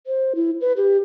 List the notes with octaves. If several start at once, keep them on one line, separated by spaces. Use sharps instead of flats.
C5
E4
B4
G4